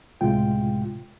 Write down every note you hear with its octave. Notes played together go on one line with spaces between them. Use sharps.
C#2 A2 C3 G#3 F4 G5